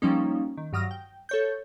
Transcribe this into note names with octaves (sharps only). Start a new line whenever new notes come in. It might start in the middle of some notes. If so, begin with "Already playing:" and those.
F3 G3 A#3 C#4 D#4
D#3
G2 F#3 D#6 F6 A#6
G5
A4 C#5 G6